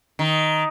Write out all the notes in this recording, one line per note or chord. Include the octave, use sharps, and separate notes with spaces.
D#3